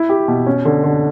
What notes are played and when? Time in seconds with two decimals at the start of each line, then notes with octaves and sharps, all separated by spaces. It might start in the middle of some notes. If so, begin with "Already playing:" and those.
Already playing: E4
0.09 G4
0.28 B2
0.46 C#4
0.65 D3
0.84 D3